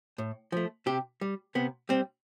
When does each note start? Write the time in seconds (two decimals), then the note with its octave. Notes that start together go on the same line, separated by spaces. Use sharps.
0.18 A2
0.52 F3 A3
0.86 C3 G4
1.21 G3
1.55 C3 B3
1.89 G3 C4